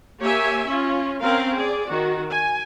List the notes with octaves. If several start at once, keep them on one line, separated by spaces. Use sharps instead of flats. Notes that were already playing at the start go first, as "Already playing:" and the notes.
A#3 G4 C#5 E5 G#5
C#4 F4
C4 C#4 A#4 F5
G#4 D5
D#3 F#4
G#5